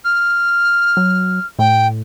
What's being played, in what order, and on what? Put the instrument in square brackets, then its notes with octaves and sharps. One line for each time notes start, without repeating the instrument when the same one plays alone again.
[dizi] F6
[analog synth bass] F#3
[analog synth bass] A2 [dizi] G5